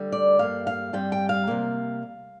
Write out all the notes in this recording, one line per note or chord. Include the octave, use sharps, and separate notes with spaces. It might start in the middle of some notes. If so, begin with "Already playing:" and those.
Already playing: D2 D3 G3
D5
G2 G3 A#3 F5
F5
G2 G3 C4 G5
G5
F5
C3 G3 A#3